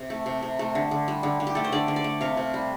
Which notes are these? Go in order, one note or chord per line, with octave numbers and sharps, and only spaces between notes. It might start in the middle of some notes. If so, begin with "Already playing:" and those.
Already playing: C3
A3
C3
C3
A3
D3
D3
G3
D3
D3
G4
A3 A4
C5
D3 D5
D3
D5
A3
C3 F5
C3
G3